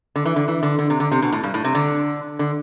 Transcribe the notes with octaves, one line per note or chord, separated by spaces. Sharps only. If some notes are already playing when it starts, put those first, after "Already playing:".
D3
E3
D3
E3
D3
D3
C3
D3
C3
B2
A2
G2
A2
C3
D3
D3